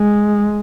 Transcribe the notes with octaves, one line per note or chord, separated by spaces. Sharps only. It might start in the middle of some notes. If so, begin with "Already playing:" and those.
Already playing: G#3